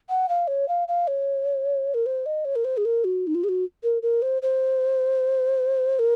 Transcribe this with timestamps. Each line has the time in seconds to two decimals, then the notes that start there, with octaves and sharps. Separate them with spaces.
0.09 F#5
0.29 F5
0.48 C#5
0.68 F5
0.88 F5
1.08 C#5
1.94 A#4
2.06 C5
2.26 D#5
2.45 C#5
2.56 A#4
2.65 C5
2.77 G#4
2.85 A#4
3.04 F#4
3.27 D#4
3.35 F4
3.44 G#4
3.49 F#4
3.83 A#4
4.02 A#4
4.22 C5
4.42 C5
5.99 A#4